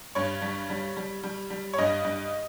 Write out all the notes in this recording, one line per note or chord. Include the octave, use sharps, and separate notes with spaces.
G2 C#5
G3
G3
G3
G3
G3
C#5
G2 D#5
G2